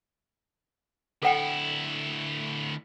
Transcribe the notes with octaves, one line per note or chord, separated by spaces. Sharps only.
D2 E4 A4 F#5 G5